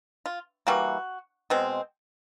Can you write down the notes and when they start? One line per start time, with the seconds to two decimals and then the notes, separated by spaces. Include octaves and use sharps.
0.26 F4
0.67 E3 G3 A#3 F#4
1.50 B2 G#3 C4